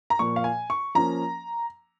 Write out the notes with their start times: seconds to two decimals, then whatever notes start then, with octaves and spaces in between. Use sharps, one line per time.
0.10 A#5
0.19 A#2 F3 A#3 C#6
0.36 F5
0.44 G#5
0.70 C#6
0.95 F3 A#3 C#4 A#5